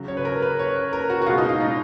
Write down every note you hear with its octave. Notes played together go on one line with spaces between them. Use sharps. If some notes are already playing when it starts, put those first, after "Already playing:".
Already playing: C#3 F#3
C#5
B4
A#4
B4
C#5
B4
A#4
F#4
F#4
B2 G#3 F4
D#4
F4
D#4